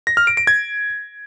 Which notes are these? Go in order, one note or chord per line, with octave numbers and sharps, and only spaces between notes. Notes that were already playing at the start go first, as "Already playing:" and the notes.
A#6
F6
D7
D7
G#6